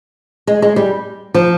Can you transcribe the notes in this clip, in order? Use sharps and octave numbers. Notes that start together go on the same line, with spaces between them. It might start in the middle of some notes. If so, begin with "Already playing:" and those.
G#3
G#3
G3
F3